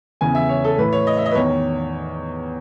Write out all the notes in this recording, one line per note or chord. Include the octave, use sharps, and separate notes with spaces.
E2 C#3 E3 G#5
E5
C#5
A4
A2 E3 B4
C#5
D#5
E5
D#5
B4
E2 D#3 C#5